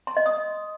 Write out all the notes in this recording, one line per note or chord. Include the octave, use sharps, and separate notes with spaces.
C6
D#5
D#6